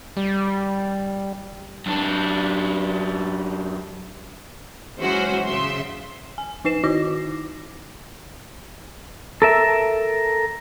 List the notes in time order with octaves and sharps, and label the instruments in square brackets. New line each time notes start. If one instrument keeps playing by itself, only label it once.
[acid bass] G3
[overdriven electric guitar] F#2 D4
[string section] E3 F#3 G#3 C#4 F#4 C5
C#3 E5 C6
[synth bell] G#5
F3 D#4 B4 C7 E7
D#3 D#4 E4 F#4 D6 A#6
[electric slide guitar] A4 A#4 E5